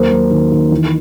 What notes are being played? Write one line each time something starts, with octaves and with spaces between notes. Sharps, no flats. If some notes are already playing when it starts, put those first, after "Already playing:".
Already playing: D#2 F#3 A#4 C5
F#3
D#3
D#3
E3